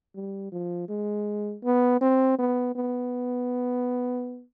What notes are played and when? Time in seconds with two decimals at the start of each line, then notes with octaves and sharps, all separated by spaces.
0.15 G3
0.52 F3
0.89 G#3
1.64 B3
2.01 C4
2.39 B3
2.75 B3